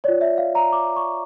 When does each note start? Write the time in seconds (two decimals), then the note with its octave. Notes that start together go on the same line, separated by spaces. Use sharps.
0.04 C#5 D5
0.08 F4
0.21 E5
0.38 F5
0.55 A#5
0.72 D6
0.96 C#6